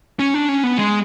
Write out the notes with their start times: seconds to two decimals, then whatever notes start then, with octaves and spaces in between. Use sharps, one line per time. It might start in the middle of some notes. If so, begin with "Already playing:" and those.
0.19 C#4
0.34 D4
0.49 C#4
0.63 B3
0.78 G#3